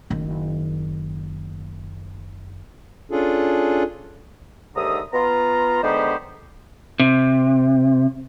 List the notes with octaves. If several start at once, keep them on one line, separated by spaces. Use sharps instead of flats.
F#1 D#3
C#4 D4 F4 G#4 A4
D#2 G#2 D3 E5 A#5 D#6
B3 F4 A#5
D3 G#3 B3 D#4 G4 C5
C3